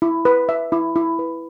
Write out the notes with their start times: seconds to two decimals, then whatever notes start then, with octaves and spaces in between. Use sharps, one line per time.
0.02 E4
0.25 B4
0.49 E5
0.72 E4
0.96 E4
1.19 B4